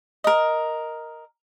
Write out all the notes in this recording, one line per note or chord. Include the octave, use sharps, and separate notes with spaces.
A#4 D#5